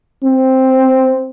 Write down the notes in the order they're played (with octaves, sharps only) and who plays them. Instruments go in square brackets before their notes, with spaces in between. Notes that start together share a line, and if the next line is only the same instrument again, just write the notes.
[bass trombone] C4